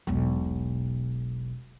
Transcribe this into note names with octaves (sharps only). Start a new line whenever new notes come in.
E1 B1